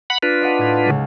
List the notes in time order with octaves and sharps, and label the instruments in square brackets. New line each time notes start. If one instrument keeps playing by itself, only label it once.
[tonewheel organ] F#5 B5
D4 F4 B4
[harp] D#5 F5 F#5
A2 G#6
C#2 C#3 G#3